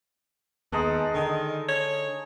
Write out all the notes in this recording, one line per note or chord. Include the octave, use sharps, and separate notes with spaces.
D#2 G#3 B3 D#4 A4
D3 D#3
C#5